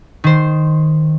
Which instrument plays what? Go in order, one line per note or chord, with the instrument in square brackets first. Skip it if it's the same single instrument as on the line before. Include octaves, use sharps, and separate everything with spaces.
[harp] D#3 C5